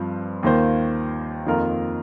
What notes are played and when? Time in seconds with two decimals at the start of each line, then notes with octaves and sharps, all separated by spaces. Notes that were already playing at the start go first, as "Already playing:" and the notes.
Already playing: G2 F3 C4
0.43 D#2 D#3 A#3 F4 C5
1.46 F2 D#3 A#3 F4 A#4